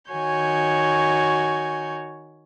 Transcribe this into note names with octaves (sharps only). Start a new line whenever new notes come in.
D#3 F#4 C#5 G#5 G6